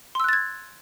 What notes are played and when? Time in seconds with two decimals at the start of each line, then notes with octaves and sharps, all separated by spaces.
0.15 C6
0.20 E6
0.24 F#6
0.29 A6
0.33 G#6